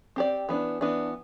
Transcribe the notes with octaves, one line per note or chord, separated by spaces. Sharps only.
C4 G4 D5
E3 B3 D4
E3 B3 D4